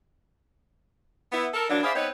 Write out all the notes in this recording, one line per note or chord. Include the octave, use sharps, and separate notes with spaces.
B3 E4
A4 A#4
E3 F#3 A#3 D4
E4 G#4 C5 D5 E5 F5
B3 C4 D#4 B4 C#5